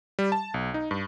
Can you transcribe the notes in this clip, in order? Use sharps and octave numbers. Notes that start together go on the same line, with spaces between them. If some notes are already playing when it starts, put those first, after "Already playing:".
G3
A5
B1
D#4
G2